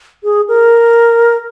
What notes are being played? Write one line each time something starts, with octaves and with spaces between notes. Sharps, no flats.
G#4
A#4